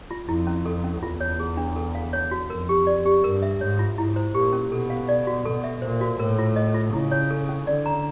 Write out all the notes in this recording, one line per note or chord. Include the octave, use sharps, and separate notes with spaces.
F4
F2 E4
C#4
A4
C#4
E2 F4
C#5
G#4
D4
A4
F5
C#5
F#4
F2 A#4
G4
D5
G4
G2 A#4
E5
G#2 C#5
F4
G#2 E4
C5
A#2 G4
C#4
B2 A4
F5
D5
F#4
B2 A4
E5
A#2 C5
F#4
A2 A#4
F4
D#5
F4
C#3 E4
C#5
A4
C#4
D3 D5
A#5